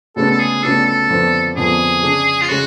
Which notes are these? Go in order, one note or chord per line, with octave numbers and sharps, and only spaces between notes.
D2 C#3 G#3 B3 D4 A4
A4
G#4
D2 C#3 G#3 B3 D4 A4
A4
F2 D3 F3 B3
F2 D3 F3 B3 G#4
C#3 G#3 D4
F4
C#3 G#3 F#4